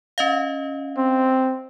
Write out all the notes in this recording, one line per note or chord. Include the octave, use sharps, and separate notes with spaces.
C#4 D#5 F5
C4